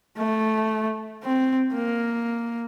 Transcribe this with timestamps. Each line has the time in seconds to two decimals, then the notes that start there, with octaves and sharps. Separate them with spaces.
0.18 A3
1.23 C4
1.74 A#3